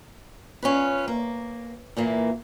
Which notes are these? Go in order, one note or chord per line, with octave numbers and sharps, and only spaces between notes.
C#4 F4 B4
A#3
A#2 E3 A#3